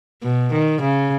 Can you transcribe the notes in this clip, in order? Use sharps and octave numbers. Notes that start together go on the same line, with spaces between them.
B2
D#3
C#3